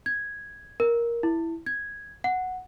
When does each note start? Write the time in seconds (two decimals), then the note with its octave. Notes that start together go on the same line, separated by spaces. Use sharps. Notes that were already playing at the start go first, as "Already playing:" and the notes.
0.06 G#6
0.80 A#4
1.23 E4
1.66 G#6
2.24 F#5